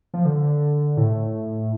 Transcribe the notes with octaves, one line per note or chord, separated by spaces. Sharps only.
F3
D3
A2